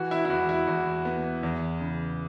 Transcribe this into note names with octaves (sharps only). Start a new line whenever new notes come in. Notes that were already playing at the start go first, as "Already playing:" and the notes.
Already playing: E3 F#4
E4
E4
E2 F#4
E4
E2 F#4
B3
E2
C#3